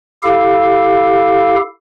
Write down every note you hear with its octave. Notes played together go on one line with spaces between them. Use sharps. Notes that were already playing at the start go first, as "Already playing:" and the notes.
E4 G4 A4 F5